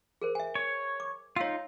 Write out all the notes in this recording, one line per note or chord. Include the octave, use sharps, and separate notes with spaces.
G#4 A#4 C5
E5 G#5
C#5
D6
D#4 F4 C#5 F5 E6